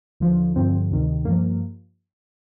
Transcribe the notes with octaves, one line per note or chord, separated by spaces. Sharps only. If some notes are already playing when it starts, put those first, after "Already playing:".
D#2 D3 F3
G2 D3 F3 C4
D2 C3 D#3
G2 F3 A#3